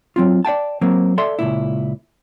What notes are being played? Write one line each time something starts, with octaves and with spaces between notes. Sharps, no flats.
F#3 C4 F4
D5 F5 G5 A5
F#3 A#3 C4
A4 D5 E5 C6
C#2 F#2 A#2 E4